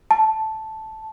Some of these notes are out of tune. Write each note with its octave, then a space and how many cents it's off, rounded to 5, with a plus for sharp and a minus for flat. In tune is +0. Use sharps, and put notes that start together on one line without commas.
A5 -5